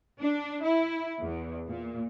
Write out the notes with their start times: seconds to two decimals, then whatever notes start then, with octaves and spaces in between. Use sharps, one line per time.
0.17 D4
0.62 E4
1.21 E2
1.67 A#2